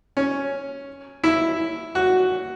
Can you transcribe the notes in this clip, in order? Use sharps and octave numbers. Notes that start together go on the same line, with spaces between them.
C#4
E4
F#4